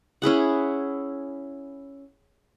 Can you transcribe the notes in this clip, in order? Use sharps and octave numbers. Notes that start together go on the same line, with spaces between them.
C#4 E4 G#4 F#5